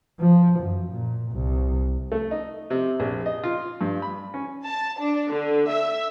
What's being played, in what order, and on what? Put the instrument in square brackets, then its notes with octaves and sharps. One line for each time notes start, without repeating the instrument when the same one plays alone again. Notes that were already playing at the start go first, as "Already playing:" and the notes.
[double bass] F3
F#2
A#2
C2
[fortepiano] A3
D#4
C3
A#1
D#5
F4
G2
B5
C#4
[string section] A5
D4
D3
E5